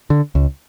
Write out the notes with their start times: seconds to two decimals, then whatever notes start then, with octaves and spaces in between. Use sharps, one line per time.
0.10 D3
0.35 C#2